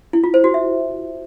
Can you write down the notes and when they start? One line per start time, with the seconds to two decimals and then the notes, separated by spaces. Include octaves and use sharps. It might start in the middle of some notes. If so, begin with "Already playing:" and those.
0.13 E4
0.24 F4
0.34 C5
0.44 F#4
0.54 E5